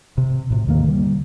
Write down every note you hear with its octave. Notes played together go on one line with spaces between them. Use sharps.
C3
A2 C3
D#2 D#3 F3 A#3
D3 G3